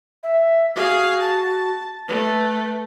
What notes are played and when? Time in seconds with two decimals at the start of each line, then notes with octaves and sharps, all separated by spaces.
0.23 E5
0.76 F#4 G#4 F5
1.21 A5
2.08 A3 B4